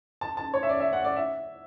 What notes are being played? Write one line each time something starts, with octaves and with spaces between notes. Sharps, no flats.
A5
A5
C#5
E5
D5
E5
F#5
D5
E5